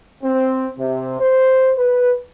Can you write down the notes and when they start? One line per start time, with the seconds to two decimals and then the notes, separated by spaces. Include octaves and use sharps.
0.23 C4
0.78 C3
1.20 C5
1.77 B4